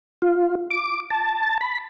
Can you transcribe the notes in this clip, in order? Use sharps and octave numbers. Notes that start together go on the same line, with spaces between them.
F4
D6
A5
B5